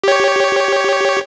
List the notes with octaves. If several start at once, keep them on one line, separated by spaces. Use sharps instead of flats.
G4 C#5